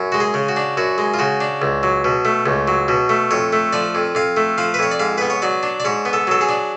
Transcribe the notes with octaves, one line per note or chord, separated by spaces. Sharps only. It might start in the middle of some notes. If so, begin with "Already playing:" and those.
Already playing: F#2
G#3 F#4
G#4
C#3
F#4
D4
F#2 F#4
G#3
F4
C#3 F#4
D4
C#2
F#3
B2
A3
C#2
F#3
B2
A3
F2 C#5
A3
F3 D5
F2
F2 F5
A3
F3 F5
B4
F2 C#5
D5
G#2 F5
B3 B4
C#5
F#3 D5
D4
D5
G#2 C#5
B3
A4
F#3 A4
G#4
D4